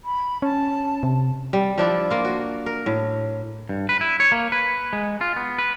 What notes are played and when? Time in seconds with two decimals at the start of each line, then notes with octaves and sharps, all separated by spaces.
0.05 B5
0.42 C#4 A5
1.03 C3
1.53 G3
1.78 F3 D4 E4 D5
2.10 A#3 F4
2.25 F#4
2.66 A#4
2.86 A2
3.69 G2
3.89 B4
4.01 E4
4.20 C#5
4.32 A#3
4.52 B4
4.93 G#3
5.21 F4
5.36 B3
5.58 B4